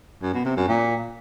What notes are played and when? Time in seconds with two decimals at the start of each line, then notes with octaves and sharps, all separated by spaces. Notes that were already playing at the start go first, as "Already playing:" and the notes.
0.22 F#2
0.33 B2
0.45 C3
0.57 F#2
0.68 A#2